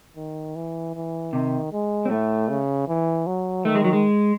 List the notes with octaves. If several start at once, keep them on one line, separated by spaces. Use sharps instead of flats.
D#3
E3
E3
C3 D#3
G#3
C4
A2 A3
C#3
E3
F#3
D#3 A3
G#3
F#3
G#3